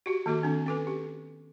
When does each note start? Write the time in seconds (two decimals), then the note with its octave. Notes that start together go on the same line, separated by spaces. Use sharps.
0.06 F#4 G4
0.26 D#3 A#3 F#4 A4
0.43 D#3 C4 D4
0.66 C#4 A4 B4
0.87 G4